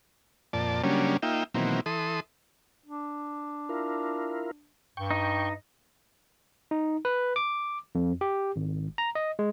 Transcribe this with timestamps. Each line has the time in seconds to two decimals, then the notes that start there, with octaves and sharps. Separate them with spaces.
0.53 F2 A#2 D5 A5
0.84 C#3 F#3 G3 A#3 C#4 D4
1.22 A#3 D#4 F4 E5 G5
1.54 B2 D#3 E3 F#3 A#3 C4
1.86 E3 A4 C6 D#6
2.86 D4
3.69 E4 F4 A#4
4.97 G2 G5 C#6
5.11 D#4
6.71 D#4
7.05 B4
7.36 D6
7.95 F2
8.21 G4
8.56 G#1
8.98 A#5
9.15 D#5
9.39 G#3